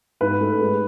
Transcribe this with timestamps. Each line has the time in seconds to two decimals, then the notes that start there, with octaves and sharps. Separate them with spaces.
0.21 G#2 B4
0.41 A3
0.61 G#3